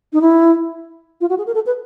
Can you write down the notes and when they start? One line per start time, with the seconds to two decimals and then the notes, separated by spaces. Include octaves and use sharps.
0.13 D#4
0.21 E4
1.21 F4
1.30 F#4
1.38 G#4
1.46 A#4
1.55 A4
1.66 B4